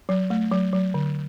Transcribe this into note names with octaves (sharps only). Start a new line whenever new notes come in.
F#3
A3
F#3
F#3
D3